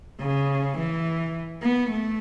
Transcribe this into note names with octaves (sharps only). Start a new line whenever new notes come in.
C#3
E3
B3
A3